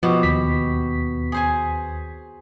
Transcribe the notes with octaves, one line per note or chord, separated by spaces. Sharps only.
B2 F3 F#4 G4
D#2 B6
G#4 C5 G#5